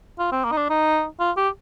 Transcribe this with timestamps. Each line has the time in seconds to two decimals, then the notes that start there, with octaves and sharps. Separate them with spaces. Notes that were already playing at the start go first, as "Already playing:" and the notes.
0.19 F4
0.32 C4
0.44 A#3
0.51 D#4
0.57 D4
0.70 D#4
1.20 F4
1.37 G4